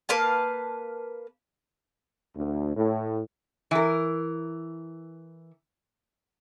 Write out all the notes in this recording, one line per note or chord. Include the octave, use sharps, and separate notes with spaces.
A#3 B4 F5 A5
D2
A2
E3 A#4